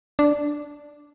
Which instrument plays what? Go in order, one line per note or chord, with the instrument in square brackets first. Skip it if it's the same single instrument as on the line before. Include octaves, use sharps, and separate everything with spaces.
[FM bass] D4